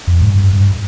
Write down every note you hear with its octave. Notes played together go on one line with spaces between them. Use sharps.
F2
G#2
G2
G2